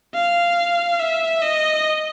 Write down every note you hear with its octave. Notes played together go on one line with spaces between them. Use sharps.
F5
E5
D#5